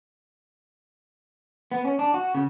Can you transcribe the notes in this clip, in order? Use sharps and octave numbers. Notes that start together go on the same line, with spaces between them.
B3
C#4
D4
F#4
C#3